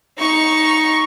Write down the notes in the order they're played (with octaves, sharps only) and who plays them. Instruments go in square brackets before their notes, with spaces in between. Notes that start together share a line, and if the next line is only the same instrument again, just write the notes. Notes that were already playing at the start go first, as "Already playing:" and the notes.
[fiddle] D#4 C#6